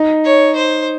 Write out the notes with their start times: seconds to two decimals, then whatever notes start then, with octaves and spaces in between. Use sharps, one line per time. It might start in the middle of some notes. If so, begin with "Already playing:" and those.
Already playing: D#4
0.24 C#5
0.55 C5